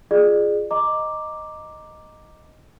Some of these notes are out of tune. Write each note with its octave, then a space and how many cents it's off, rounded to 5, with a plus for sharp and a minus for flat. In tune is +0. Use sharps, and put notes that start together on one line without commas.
F4 +0 G#4 +5 D5 +35
D#5 -5 A#5 +0 D6 +0